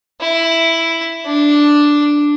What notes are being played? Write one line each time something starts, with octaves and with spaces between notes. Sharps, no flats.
E4
D4